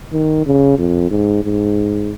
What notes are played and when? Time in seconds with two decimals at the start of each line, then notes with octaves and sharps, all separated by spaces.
0.13 D#3
0.46 C#3
0.78 F2
1.11 G#2
1.44 G#2